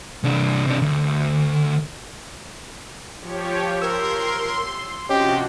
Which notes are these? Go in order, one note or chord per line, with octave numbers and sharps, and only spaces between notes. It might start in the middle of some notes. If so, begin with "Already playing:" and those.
C2 D4
C3 D4
D2
F3 G4 C#5
A#4 C6 E6
C3 F3 C#4 F#4 G4 D#5